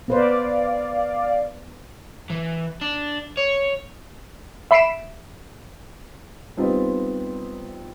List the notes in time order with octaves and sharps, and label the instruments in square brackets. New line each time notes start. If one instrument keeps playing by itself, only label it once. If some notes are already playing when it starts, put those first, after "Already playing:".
[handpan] B3 B4 C5 [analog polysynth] D5 F5
[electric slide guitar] E3
D4
C#5
[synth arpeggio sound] E5 B5 B6 C7 D7 E7
[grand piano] G3 B3 C4 D#4 F4